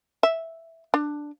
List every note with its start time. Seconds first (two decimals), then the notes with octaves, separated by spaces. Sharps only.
0.23 E5
0.94 D4